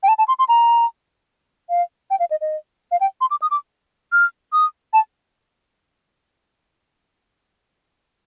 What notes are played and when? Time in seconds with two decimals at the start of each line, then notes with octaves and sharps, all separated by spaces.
0.03 G5
0.08 A5
0.18 A5
0.28 C6
0.39 C6
0.49 A#5
1.70 F5
2.10 G5
2.20 F5
2.31 D#5
2.41 D#5
2.91 F5
3.01 G5
3.21 C6
3.31 D6
3.42 D#6
3.51 D6
4.12 F6
4.53 D#6
4.93 A5